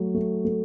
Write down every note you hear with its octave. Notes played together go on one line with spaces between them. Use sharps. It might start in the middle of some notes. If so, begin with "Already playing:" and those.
Already playing: F#3 A3
A3
A3